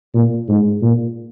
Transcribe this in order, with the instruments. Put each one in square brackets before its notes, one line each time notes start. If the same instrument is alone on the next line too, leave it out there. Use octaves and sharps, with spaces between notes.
[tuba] A#2
G#2
A#2